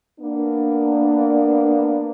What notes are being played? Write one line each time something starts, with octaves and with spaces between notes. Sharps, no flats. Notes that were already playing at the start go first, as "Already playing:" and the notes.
A#3 B3 D4